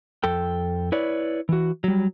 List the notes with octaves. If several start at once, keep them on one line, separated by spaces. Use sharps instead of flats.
F2 A4 G5
E4 B4 C#5 D5
E3 F#4
F#3 G3